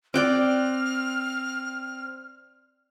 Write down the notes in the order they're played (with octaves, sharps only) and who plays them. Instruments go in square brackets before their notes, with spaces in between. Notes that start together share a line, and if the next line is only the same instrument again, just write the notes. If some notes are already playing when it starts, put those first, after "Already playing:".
[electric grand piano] C4 F#6 [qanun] D5 G5 D6 [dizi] F6